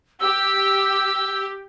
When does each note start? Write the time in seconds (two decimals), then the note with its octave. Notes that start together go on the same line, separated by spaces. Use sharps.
0.20 G4 E6